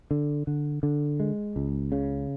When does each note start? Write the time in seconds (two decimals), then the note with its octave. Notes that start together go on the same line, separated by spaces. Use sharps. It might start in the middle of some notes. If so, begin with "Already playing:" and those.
0.11 D3
0.47 D3
0.83 D3
1.20 G#3
1.56 C#2
1.92 C#3